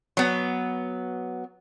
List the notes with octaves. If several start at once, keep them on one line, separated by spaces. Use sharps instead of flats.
F#3 B3